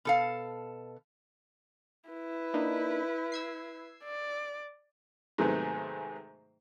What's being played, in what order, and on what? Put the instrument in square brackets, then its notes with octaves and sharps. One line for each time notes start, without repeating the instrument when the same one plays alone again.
[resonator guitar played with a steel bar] B2 A4 F5
[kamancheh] E4 B4
[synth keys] A#3 D4 D#4
E6 G#6 C7
[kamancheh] D5
[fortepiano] G#2 C3 D#3 F#3 A3 B3